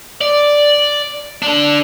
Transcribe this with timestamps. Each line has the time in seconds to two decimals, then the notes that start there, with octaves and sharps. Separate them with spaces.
0.21 D5
1.42 D4 A4